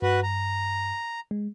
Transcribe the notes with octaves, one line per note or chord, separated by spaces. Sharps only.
G2 F#4 B4
A#5
G#3